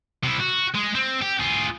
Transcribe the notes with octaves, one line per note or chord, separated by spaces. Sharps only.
C3 E4
F#4
G#3
C4
G4
F4 G#4